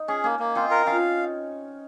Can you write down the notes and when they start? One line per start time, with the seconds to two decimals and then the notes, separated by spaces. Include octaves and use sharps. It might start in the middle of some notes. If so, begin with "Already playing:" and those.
Already playing: D#4
0.08 C#4 G#4
0.24 A#3 C#4
0.39 A#3
0.55 C4 D#4 F4
0.71 A#4
0.86 C#4 F4 F5